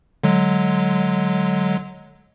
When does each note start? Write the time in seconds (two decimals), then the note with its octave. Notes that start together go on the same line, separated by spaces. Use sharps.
0.24 D3 F#3 G#3